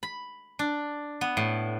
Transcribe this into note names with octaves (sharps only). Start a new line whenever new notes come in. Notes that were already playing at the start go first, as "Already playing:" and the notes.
B5
D4
B3
A2